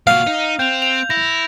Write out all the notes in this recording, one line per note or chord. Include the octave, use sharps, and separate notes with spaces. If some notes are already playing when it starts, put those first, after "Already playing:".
A#2 F#4 F5
D#4
C4 G6 F7
F7
E4 A#6